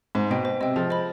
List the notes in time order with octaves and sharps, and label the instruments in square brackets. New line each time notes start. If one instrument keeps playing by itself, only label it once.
[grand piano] G#2 [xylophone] C5
[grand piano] B2 [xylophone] D#5 G5
[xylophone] C5
[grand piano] C3 [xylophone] D#5 G5
[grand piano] F3 [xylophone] G#4
[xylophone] C5 D#5 B5